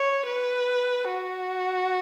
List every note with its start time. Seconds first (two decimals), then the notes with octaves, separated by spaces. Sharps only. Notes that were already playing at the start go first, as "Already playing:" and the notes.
Already playing: C#5
0.26 B4
1.09 F#4